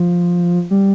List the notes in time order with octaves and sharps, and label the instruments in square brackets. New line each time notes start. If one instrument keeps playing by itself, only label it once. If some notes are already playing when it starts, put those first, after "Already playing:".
Already playing: [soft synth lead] F3
G3